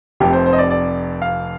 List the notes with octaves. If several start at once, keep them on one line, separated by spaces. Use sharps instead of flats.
F1 F2 C3 G4
C5
C5
D#5
D5
D5
F5